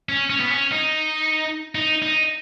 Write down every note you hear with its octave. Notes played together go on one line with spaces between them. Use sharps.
C#4
C#4
B3
C#4
D#4
D#4
D#4